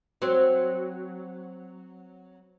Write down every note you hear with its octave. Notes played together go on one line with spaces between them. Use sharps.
F#3 C4